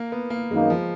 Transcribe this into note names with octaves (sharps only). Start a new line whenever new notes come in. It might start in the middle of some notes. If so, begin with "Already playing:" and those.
Already playing: A#3
B3
A#3
F#2 D#3 G#3 A#3 D#4
F3